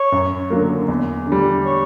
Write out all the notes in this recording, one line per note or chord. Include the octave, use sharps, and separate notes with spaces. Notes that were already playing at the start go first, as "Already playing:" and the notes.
Already playing: C#5
F#2
D3 F#3 A#3
E2
D3
G3
C#5